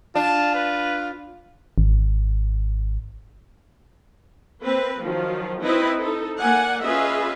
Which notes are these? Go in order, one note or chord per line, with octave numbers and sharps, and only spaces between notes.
D4 F4 A5
B4
G#1
A#3 C4 B4
D#3 F3 F#3 F4
C4 D#4 E4 B4 D#5 B5
D#4 A4
A#3 D5 F#5 G#5
C#4 F4 G#4 B4 D#5 E5